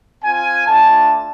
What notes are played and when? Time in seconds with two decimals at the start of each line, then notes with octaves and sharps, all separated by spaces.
0.24 C4 F4 G#5
0.67 A3 D4 F4 A5